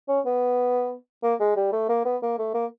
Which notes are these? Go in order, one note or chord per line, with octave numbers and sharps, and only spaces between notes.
C#4
B3
A#3
G#3
G3
A3
A#3
B3
A#3
A3
A#3